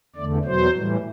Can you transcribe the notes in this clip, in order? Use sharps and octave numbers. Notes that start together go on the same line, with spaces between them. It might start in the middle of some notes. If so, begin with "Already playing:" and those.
E2 D3 A3 D5
E2 B2 F#3 C5
A2 E3 G3